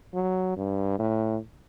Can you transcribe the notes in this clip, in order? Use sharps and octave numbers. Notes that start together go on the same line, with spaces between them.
F#3
G2
A2